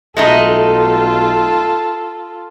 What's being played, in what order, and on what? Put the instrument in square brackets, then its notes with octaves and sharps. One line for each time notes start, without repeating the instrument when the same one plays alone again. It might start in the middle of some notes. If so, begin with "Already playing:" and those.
[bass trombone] B1 [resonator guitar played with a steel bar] G#3 A3 D#4 [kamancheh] F4 A4